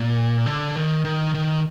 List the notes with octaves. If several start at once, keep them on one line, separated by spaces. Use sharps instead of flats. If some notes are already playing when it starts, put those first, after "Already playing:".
Already playing: A#2
D3
D#3
D#3
D#3